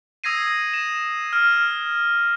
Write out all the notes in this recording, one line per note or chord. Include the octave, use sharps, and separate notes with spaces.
D#6 E6 G#6 A#6 C7 D#7
E7
F6